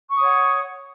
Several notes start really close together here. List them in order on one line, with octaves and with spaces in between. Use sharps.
C#6 D#6 C#5 F#5